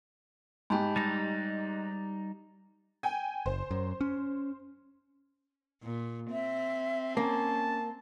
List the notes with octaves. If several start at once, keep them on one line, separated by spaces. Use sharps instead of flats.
G#2 G4 G#5 A5 B5
G3 D#4 A6 A#6
G5 G#5
F#1 C5
F#2
C#4
A#2
C4 E5
A#3 C#4 A5